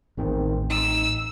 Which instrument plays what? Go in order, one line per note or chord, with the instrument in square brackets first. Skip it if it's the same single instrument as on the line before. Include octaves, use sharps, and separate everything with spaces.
[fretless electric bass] A1 [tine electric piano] E2 D#3 C4
[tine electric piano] D#4 [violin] E6